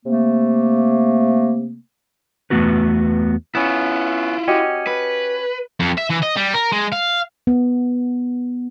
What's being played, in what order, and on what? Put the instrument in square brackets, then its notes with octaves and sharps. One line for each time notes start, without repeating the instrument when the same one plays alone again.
[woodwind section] C3 A3 A#3
[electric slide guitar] E2 D#3 A3 B3 F#4 B4
[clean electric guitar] B3 C#4 [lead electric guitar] E4 F4
[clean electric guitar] C#4 [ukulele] F#4 G4 D#5
[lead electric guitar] B4
[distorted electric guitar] F2
E5
E3
D#5
G3
A#4
G#3
F5
[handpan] B3